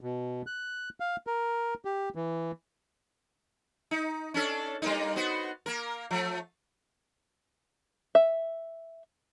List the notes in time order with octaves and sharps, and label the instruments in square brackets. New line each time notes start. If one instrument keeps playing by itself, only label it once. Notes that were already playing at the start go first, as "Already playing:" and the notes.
[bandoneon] B2
F#6
F5
A#4
G4
E3
[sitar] D#4
C#4 D4 A4
G3 A#3 D#4
B3 F#4 C5
A#3 A#4
F3 A3
[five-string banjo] E5